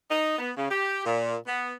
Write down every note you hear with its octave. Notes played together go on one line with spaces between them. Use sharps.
D#4
B3
C#3
G4
A#2
B3